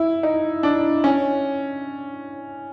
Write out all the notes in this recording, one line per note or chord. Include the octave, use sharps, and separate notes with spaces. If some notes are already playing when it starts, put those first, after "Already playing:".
Already playing: E4
D#4
D4
C#4